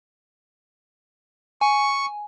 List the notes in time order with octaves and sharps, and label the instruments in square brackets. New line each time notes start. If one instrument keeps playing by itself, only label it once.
[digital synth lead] G#5 [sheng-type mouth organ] C#6